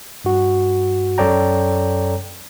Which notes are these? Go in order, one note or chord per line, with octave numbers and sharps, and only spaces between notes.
G2 F#4
F#2 A4 C#5 D5 G5 A#5